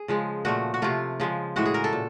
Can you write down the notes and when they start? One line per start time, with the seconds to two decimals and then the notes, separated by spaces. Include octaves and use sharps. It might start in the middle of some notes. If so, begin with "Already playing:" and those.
Already playing: G#4
0.08 C#3 F3 G#3
0.45 A#2 F3 A3 F#4
0.74 F#4
0.82 C3 F3 A3 F4
1.20 C#3 F3 G#3
1.56 A2 E3 G#3 F#4
1.66 G#4
1.74 A#4
1.84 A4
1.93 A#2